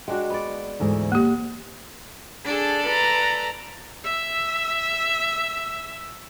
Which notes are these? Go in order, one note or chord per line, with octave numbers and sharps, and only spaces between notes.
G#3 D4 F#4 G5
B3 D5
D2 G#2 E3
A#3 G4
D4 G#4 A4 D5
B4 A#5
E5 E6